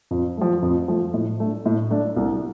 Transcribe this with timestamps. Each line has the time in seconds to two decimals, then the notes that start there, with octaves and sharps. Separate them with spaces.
0.11 F2
0.37 F3 A3
0.62 F2
0.88 F3 A3
1.14 A2
1.40 A3 D4
1.66 A2
1.91 A3 D4
2.16 C2